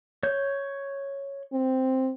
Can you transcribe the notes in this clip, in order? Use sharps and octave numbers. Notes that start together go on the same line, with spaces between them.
C#5 G6
C4